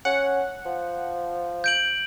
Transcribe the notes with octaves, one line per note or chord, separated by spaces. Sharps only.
C#4 F#5
F3
G6 D7 F#7